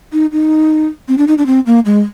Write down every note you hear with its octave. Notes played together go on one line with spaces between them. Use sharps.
D#4
D#4
C4
D4
D#4
D4
C4
A#3
G#3